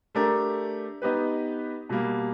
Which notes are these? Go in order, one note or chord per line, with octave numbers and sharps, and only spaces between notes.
A3 D4 G4 A#4
B3 D#4 G4 B4
B2 G3 A#3